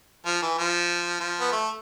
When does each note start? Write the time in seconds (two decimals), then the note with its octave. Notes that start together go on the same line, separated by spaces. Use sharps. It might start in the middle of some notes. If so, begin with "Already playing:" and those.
0.26 F3
0.42 E3
0.58 F3
1.20 F3
1.40 B3
1.52 A3